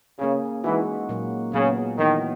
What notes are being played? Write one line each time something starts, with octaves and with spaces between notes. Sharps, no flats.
C#3 A#3 C#4 G#4
E3 G#3 D#4 F#4
A#2 F#3 A#3
A#2 C#3 F#3 B3
D#3 E3 B3 D#4